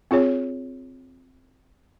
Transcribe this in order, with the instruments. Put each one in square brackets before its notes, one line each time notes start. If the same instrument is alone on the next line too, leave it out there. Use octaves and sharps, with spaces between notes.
[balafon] C4 F4 G#4 C#5